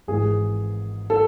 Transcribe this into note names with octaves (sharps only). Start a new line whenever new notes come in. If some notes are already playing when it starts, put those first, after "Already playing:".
G#1 G#2 E3 G#4
A4